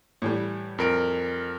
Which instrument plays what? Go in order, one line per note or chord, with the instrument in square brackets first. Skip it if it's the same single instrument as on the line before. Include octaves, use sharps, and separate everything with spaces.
[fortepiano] A2 E3 G3
[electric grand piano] F2 A#4 D7